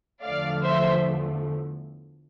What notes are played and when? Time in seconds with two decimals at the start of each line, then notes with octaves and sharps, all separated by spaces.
0.23 E2 D3 F3 A3 D5 F5
0.63 C5 E5